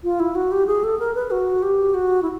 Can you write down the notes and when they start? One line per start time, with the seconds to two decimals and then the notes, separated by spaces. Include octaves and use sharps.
0.04 F4
0.20 E4
0.35 F#4
0.52 G4
0.67 G#4
0.84 A4
0.99 A#4
1.15 B4
1.31 F#4
1.63 G4
1.94 F#4
2.22 E4